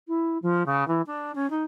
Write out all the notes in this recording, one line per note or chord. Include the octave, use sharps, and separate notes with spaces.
E4
F3
C#3
E3
D4
C#4
D#4